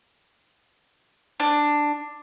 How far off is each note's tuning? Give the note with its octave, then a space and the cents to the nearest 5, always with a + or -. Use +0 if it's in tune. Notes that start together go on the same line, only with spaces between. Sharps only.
D4 +5